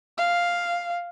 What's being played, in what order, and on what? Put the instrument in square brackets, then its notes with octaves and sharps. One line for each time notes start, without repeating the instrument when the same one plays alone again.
[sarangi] F5